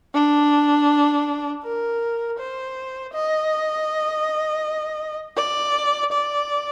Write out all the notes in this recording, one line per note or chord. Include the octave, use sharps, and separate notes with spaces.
D4
A#4
C5
D#5
D5
D5